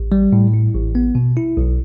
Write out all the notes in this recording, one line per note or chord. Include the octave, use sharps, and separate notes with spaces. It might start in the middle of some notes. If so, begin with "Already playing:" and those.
Already playing: A1
G3
A2
E4
A1
B3
B2
E4
B1